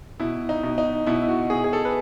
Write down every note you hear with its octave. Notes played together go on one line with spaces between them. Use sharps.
B2 E4
D#4
B2
D#4
B2 E4
E4
F#4
B2 G#4
G#4
A4
B4